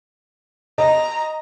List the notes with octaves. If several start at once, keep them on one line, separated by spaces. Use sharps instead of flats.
D#5 A#5